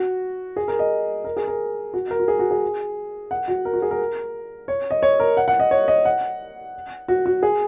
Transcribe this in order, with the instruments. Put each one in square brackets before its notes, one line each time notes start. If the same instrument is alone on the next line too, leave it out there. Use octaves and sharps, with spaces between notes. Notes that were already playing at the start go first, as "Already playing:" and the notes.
Already playing: [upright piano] F#4
G#4
A#4
D#5
A#4
G#4
A#4
F#4
A#4
F#4
G#4
F#4
G#4
F#5
F#4
A#4
F#4
G#4
A#4
C#5
D#5
C#5
A#4
F#5
F#5
D#5
C#5
D#5
F#5
F#4
F#4
G#4